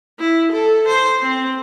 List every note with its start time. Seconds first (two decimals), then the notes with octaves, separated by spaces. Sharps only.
0.19 E4
0.52 A4
0.88 C5
1.22 C4